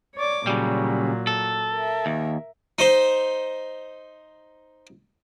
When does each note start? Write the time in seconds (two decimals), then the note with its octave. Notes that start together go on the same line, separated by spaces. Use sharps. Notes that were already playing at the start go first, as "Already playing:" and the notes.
0.15 C#5 D5 D6
0.47 A#2 C#3 F#3 G3
1.27 A4
1.73 A#4 E5
2.06 D#2
2.79 D#4 C5